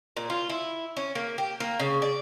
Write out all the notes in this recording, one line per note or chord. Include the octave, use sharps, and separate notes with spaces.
A#2
F4
E4
C#4
A#3
G4
A#3
C#3
D5